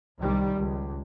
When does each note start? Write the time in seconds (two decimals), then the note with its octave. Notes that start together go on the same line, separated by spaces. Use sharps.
0.22 C2 D#3 G3
0.58 C#2